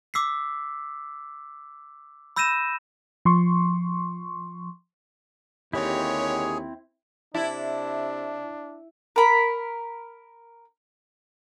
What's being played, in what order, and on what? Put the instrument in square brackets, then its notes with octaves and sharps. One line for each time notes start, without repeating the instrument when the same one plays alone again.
[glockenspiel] D6 E6 B6 C7
B5 E6 G6 A#6 D#7 E7
[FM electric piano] F3 C6 C#6
[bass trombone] D#2 [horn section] D3 G4 C#5 [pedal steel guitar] C4 E4 [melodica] G#4
[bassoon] C3 [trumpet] D4 [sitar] E4 [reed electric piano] D5 A5
[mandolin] A#4 B5